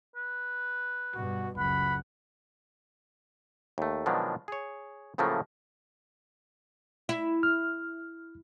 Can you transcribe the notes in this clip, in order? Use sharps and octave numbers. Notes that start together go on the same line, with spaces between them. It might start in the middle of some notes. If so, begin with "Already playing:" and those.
B4
G2 B2 F#4
F#1 C#2 F#5 B5
D#2 A3
B2 D#3 F3 F#3 G#3 D4
G#4 C#5
A2 C#3 F3 F#3 A3 A#3
E4
F6